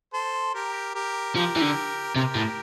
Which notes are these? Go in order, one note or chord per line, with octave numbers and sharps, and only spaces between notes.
A4 C5
G4 A#4
G4 A#4
F3 G4 A#4
E3
D3
C3 G4 A#4
A2